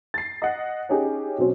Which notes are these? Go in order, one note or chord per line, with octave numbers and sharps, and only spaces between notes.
A6 C7
D#5 F#5
C#4 D#4 G4 G#4
B2 F#3 C4 C#4